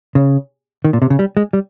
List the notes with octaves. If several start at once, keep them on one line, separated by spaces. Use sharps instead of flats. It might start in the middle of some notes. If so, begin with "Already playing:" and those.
C#3
D#3
A#2
C3
C#3
G3
G#3
G3